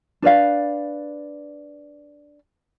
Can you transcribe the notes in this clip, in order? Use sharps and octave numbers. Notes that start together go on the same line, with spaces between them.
D4 B4 D5 F5